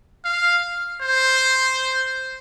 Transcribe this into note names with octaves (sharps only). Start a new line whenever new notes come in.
F5
C5